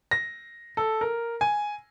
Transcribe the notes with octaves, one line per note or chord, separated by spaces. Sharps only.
A#6
A4
A#4
G#5